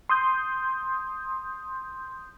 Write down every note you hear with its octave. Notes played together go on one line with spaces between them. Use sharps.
C6 D#6 G6